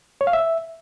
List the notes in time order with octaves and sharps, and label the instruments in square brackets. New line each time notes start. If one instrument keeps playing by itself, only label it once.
[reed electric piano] C#5
F5
E5